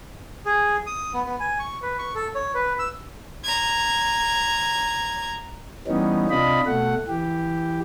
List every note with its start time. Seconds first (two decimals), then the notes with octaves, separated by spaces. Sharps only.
0.45 G#4
0.86 D#6
1.14 B3
1.25 B3
1.40 G#5
1.59 C#6
1.82 B4
1.99 C#6
2.15 A4
2.35 C#5
2.55 B4
2.79 E6
3.44 A#5 G#6
5.87 E3 G3 B3 C#4 D#4
6.30 C3 D4 F4 D#5 B5
6.66 B2 A3 F#5
7.08 E3 G4